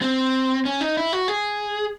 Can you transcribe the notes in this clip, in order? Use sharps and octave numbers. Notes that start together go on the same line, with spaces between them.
C4
C#4
D#4
E4
F#4
G#4